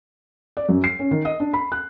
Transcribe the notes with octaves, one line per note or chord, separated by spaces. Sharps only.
D5
F#2
C7
C#4
D#3
D#5
D4
B5
F#6